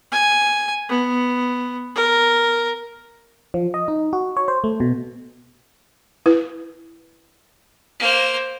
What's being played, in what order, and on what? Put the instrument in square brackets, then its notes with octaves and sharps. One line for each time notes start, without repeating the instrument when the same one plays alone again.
[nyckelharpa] G#5
B3
A#4
[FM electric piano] F3
D#5
D#4
F#4
C#5
C5
A3
B2
[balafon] E4 B4
[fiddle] A#3 C5